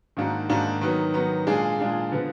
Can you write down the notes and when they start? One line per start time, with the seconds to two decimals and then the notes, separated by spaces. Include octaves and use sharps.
0.17 G#2 D#3 A#3 D4 F#4
0.49 G#2 D#3 A#3 D4 F#4
0.81 D#3 F#3 B3
1.14 D#3 F#3 B3
1.47 A#2 G#3 D4 F4 G#4
1.79 A#2 G#3 D4 F4 G#4
2.12 D3 F3 B3